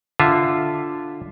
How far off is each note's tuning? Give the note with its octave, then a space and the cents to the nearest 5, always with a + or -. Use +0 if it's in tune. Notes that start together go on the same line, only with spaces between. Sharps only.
D3 +0 F4 +0 E5 +0